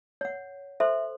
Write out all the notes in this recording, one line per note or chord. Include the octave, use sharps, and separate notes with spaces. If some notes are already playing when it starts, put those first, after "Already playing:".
C#5 F#5
A4 C5 E5 C6